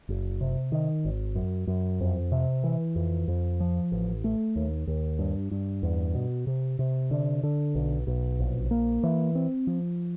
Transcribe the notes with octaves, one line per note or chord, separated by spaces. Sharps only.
F#1
C3
D#3
G#1
F#2
F#2
F2
C3
E3
F2
F2
F3
A1
A3
D#2
D#2
G2
G2
E2
B2
C3
C3
D3
D3
B1
B1
A#1
A#3
E3
C4
F3